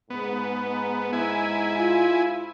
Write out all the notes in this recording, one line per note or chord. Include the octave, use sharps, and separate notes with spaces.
G#2 B3
E4 G#5
F4